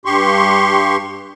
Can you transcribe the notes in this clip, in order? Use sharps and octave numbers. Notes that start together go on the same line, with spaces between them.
G2 G4 C6 C#6